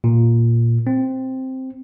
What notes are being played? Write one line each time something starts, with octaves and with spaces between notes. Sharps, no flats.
A#2
C4